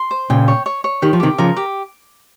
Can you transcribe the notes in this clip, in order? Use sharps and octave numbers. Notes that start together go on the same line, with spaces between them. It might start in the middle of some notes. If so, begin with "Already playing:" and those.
Already playing: C6
C5
A#2 C#3 G5
C#5
C#5
C#5
D#3 G4
F3
C3 D#3 G4
C#3 F3 A#4
G4